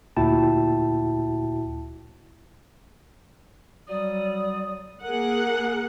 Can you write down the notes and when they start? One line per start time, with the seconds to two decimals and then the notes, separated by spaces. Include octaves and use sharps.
0.17 D2 A#2 E4 F#4 G5 A5
3.88 F#3 G3 D5 D#6
5.04 A#3 G#4 A#4 F#5